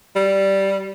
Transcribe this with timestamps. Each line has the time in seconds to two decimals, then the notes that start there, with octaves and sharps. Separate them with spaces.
0.16 G3